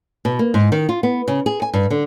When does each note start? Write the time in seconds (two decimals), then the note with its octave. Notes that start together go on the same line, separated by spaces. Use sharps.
0.25 B2
0.39 A#3
0.54 G#2
0.72 D#3
0.89 F4
1.03 B3
1.28 C#3
1.46 G#4
1.62 G#5
1.73 G2
1.90 D3